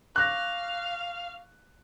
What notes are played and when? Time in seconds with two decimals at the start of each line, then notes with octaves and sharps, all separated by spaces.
0.16 F5 C#6 D6 F#6 A#6